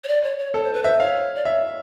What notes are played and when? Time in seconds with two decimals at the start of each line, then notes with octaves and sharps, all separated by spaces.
0.04 C#5
0.08 D5
0.24 C#5
0.39 C#5
0.54 A4 C#5
0.63 C5
0.73 B4
0.83 C5 E5
1.00 C#5 F5
1.35 D5
1.45 C#5 E5